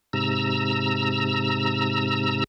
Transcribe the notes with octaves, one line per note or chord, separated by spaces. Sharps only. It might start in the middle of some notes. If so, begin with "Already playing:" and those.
G#2 C3 A#5 E6